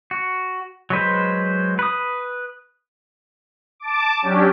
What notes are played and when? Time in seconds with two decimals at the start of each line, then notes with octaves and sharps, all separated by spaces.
0.11 F#4
0.90 F#3 G#3 B4 C5
1.79 B4 D#6
3.80 A5 D6
4.22 F#3 C#4 D4 G4